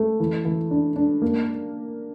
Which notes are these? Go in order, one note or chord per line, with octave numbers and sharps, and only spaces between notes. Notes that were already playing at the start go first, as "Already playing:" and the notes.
Already playing: A3
E3
E3
D4
D4
A#3